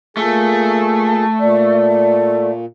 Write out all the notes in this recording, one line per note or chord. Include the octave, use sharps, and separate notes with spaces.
A#2 A3 G#4
A#2 D5